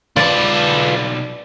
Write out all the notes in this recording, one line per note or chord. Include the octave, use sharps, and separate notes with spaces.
B1 F4 B4 D5 A5